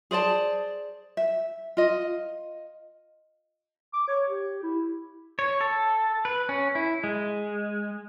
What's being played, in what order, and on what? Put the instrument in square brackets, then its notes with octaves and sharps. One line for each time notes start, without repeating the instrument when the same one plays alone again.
[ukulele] G#4 C5 D5 A5
E5
F4 D#5
[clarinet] D6
C#5
G4
E4
[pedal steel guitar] C#5
A4
B4
C#4
E4
G#3